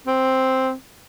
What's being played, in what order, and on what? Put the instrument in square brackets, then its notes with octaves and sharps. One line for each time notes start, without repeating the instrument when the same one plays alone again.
[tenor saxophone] C4